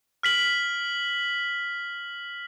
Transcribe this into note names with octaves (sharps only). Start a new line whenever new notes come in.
F6 B6 F#7